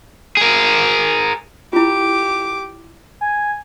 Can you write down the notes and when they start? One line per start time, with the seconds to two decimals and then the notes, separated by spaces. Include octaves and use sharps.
0.37 G#4 A#4
1.73 E4 F4 G4 D6
3.21 G#5